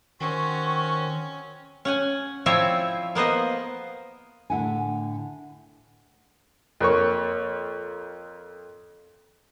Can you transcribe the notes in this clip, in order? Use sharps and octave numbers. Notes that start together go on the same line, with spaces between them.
D#3 C4 C#4 F#4 C#6
C#4 F#5 G#5
F3 C4 E4 C#5 D5 E5
A#3 B3 C5 D#5
A2 D3 D#4 E4 F#5 G#5
F2 A#3 C#5 C#6